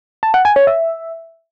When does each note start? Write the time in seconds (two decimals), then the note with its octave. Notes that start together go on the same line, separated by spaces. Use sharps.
0.23 A5
0.34 F#5
0.45 G#5
0.56 C#5
0.67 E5